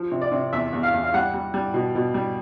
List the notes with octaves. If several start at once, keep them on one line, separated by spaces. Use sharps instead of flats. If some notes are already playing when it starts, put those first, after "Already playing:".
Already playing: F3
C3
D5
C3
E2 E5
E2
F5
E2
F5
G3 F#5
G3
G3
B2
B2
G3